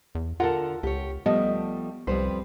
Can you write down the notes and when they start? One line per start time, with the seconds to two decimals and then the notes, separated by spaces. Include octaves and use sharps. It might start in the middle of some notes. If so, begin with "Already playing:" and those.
0.15 E2
0.40 D3 F4 A4 A#4 F#5 A#5
0.83 C#2 G4 C#5
1.26 F3 G3 A3 B3 D#5
2.07 C2 F2 G3 B4 C5